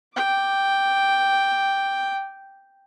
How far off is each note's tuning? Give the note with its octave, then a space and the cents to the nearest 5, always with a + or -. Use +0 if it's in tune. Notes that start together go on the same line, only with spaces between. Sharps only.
G5 +0 D6 +0